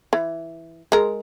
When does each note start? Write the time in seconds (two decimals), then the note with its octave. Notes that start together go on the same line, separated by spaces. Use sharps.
0.13 E3
0.92 G#3 A#4